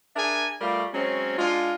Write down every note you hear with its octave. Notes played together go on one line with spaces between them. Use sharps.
D4 G#4 A#4 E5 G#5
G3 A3 F4 A#4 D5
F#3 G#3 C4 C#4
G#3 D4 F4